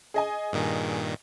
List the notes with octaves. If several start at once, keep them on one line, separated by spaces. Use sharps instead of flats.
G#4 D#5 G#5
G2 A#2 D#3